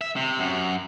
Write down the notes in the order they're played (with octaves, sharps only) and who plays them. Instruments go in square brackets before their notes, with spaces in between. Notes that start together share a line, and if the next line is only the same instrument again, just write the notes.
[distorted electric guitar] E5
C3
F#2